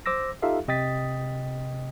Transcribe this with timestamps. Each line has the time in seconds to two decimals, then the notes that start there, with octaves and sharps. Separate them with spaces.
0.06 C5 D6 E6 A#6
0.42 D#4 F4 G4 A4 E5 F5
0.68 C3 D#5 G5 D#6 A6 B6